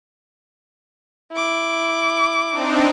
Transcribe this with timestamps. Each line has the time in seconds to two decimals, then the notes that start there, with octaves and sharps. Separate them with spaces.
1.32 E4 D6
2.50 C4 D4 D#4